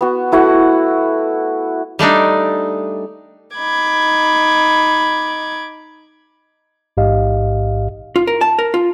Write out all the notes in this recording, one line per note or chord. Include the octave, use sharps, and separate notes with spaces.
B3 F#4
A3 E4 F#4 F#5
G3 A3 D4 D#4
D#4 B5 D6 G#6
A1 G#2 G4 D#5 F5
F4
A#4
A5
A#4
F4